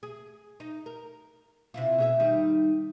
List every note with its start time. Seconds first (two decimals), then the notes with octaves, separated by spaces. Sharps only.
0.03 G#4
0.60 D#4
0.86 A#4
1.74 C3 E4 F4
1.98 B2 G#4 E5
2.20 D#3 G3 D#4